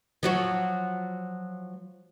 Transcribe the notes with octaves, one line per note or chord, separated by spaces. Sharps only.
F3 F#3 F#4